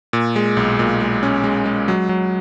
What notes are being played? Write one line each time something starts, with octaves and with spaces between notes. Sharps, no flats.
A#2
G#3
B1
A#2
G#3
C#4
G#3
G#3
F#3
F#3